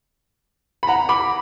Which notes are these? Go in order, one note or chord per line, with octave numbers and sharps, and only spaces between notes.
B5
F#5 A#5
B5 D6